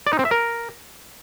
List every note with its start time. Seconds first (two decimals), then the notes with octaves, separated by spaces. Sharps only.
0.07 D5
0.13 D#4
0.19 C4
0.25 E5
0.31 A#4